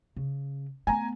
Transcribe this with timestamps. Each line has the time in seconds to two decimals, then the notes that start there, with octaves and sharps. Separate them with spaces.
0.17 C#3
0.87 A3 B3 G#5 A#5